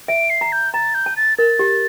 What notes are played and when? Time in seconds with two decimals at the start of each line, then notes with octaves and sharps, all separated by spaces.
0.08 E5 D7
0.30 C7
0.41 A#5
0.52 G6
0.74 A#5 A6
0.94 G6
1.06 A5
1.17 A6
1.38 A#4 A6
1.59 G4